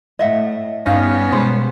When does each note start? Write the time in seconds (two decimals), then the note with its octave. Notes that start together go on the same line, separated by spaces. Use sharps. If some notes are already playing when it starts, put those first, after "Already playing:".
0.19 A2 D#5 E5 F#5
0.86 G2 G3 B3 C#4 D#4 F5 F6 A#6
1.32 B2 G#3 B4 C5